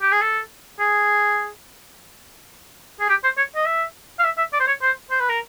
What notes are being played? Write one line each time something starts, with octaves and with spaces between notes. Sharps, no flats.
G4
G#4
A4
G#4
G#4
G4
C5
C#5
D#5
E5
F5
E5
E5
D5
C5
C#5
C5
C5
B4
A#4